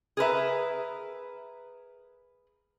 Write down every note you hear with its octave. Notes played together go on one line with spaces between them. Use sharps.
G#4 A#4 B4 E5